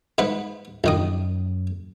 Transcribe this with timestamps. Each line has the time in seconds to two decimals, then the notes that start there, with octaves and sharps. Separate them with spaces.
0.18 G#2 B4 F#5
0.84 A#1 F#2 D#3 D#6